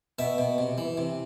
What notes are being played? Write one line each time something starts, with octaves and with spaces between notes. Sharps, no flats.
B2 E5
B2
C3
E3
C3